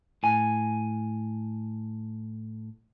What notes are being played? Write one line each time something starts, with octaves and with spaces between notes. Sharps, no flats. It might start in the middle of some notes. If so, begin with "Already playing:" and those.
A2 G#5